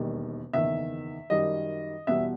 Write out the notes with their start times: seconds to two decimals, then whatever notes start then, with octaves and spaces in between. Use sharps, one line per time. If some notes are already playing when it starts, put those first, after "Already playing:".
Already playing: E1 D#2 D#3 G3
0.53 F#1 E2 D#3 E5
1.30 F#2 D#3 G3 D#5
2.07 E2 B2 G3 E5